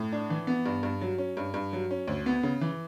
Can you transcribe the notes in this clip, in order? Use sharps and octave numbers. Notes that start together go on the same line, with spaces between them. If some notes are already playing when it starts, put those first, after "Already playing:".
Already playing: A2
D4
E3
B3
G2
G2
F#3
C#4
G2
G2
F#3
C#4
D2
B3
C#3
E3